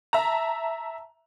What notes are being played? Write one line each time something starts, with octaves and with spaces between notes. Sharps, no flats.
E5 A5 A#5